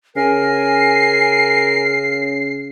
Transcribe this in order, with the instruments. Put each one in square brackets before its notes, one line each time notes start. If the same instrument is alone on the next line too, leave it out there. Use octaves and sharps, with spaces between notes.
[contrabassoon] C#3 [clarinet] A#4 [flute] G#5 [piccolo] C7